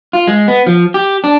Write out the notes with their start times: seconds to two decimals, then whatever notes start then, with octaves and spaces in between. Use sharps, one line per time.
0.13 F4
0.28 G#3
0.48 B3
0.67 F3
0.94 G4
1.24 D4